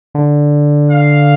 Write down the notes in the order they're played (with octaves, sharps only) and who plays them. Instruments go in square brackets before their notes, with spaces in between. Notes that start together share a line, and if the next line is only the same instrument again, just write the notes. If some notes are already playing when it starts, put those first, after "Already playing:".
[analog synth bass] D3
[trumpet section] F5